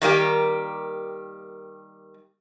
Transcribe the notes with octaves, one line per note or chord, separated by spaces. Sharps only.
D#3 G3 A#3 G4